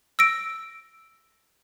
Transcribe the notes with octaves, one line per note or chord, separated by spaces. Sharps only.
E6 A#6 D7